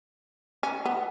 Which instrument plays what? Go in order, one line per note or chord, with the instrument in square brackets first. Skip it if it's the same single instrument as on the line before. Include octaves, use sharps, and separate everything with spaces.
[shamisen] C#4
B3